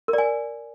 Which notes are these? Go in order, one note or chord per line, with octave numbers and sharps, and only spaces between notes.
A#4
D5
G#5